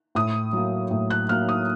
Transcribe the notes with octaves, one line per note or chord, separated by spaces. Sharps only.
A2 D#6
F#3 A#3
A2
F#6
F#3 A#3 F6
D#6